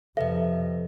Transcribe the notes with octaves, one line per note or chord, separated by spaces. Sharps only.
F2 C3 A4 B4 D#5 E5